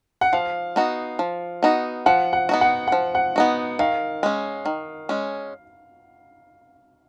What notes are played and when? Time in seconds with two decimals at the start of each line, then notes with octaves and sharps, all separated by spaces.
0.21 F#5
0.33 F3 F5
0.76 B3 D#4 F#4
1.19 F3
1.63 B3 D#4 F#4
2.06 F3 F#5
2.33 F#5
2.49 B3 D#4 F#4
2.61 F#5
2.88 F3 F#5
3.15 F#5
3.36 B3 D#4 F#4
3.79 D#3 F5
4.23 G#3 C#4
4.66 D#3
5.09 G#3 C#4